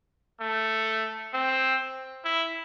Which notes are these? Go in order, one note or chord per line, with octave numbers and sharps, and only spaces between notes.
A3
C4
E4